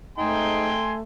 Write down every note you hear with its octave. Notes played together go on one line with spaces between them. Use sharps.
G#2 A3 D#4 G5 G#5 C6